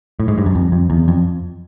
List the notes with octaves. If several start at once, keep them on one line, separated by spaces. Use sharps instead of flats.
A2
G#2
G2
F#2
F2
F2
E2
F2